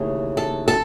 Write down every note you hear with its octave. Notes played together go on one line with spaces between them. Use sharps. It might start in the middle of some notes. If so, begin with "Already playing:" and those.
Already playing: D#2 C#3 E3 A3
A4
A4